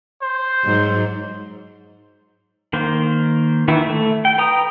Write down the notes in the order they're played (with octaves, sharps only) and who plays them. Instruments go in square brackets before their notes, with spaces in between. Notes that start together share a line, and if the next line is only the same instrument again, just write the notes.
[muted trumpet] C5
[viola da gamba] G#2 F#3
[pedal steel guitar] D#3 A#3 C5
D#3 E3 E4
A3
G5
B4 G5 A#5 D#6